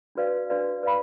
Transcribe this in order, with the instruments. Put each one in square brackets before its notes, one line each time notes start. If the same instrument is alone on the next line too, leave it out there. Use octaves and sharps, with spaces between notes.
[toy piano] D4 F#4 B4 D5 F5
D4 F#4 B4 D5 F5
B4 D5 F5 B5